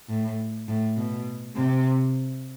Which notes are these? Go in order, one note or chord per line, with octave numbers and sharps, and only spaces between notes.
A2
A2
B2
C3